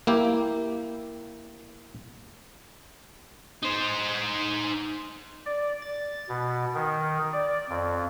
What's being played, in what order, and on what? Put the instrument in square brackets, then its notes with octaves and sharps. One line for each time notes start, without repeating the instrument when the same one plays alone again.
[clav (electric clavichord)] A#3 E4 G4
[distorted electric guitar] D#4 C5
[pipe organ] D5
A6
B2
D#3
D5
F2